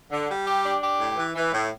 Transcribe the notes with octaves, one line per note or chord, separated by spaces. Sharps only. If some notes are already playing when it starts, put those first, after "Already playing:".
D3
G3
G4
D4
G4
A2
E3
E3
A2